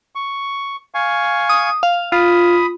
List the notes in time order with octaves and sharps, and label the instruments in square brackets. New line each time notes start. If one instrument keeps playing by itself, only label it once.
[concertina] C#6
F5 G#5 C#6
[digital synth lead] D#6
F5
[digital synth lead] F4 [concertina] B5 D#6